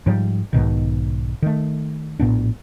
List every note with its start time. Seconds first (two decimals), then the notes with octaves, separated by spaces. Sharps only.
0.06 G#2 F3 G3
0.53 B1 G#2 B2 D#3
1.42 D#3 A3
2.20 A#1 A2 B3 D4